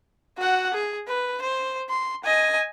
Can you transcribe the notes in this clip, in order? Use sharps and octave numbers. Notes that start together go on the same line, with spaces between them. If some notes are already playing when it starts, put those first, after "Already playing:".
F#4 F#5
G#4
B4
C5
C6
D#5 G#5